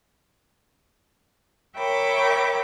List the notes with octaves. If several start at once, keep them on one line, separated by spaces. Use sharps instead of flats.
A#4 C#5 E5 G5 B5 D6